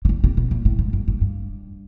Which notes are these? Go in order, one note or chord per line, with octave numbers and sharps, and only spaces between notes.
C#3
D3
C3
B2
A#2
A2
G#2
G2
G#2
G2